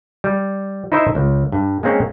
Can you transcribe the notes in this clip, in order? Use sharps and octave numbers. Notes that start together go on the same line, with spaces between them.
G3
D#4 E4 C5 D#5 E5
C#2
G2
G#3 A#3 C4 C#4